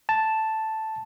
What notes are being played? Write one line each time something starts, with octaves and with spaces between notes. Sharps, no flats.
A5